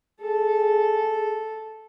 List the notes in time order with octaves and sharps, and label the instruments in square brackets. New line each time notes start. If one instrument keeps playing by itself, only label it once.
[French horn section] G#4 [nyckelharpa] A4